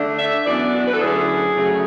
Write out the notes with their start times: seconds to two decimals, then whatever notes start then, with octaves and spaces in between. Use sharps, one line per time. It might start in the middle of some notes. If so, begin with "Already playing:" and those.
Already playing: D3 A3 D4
0.18 E5
0.46 F#2 E3 B3 D4 D5
0.73 F#4
0.87 B4
0.93 A4
1.01 D2 D3 F#3 C#4 E4 G#4
1.56 F#2 C#3 F#3 A3